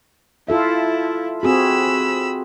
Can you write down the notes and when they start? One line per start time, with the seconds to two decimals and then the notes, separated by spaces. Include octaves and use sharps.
0.48 E4 F4 A4 E5
1.43 C4 F#4 G#4 B5 E6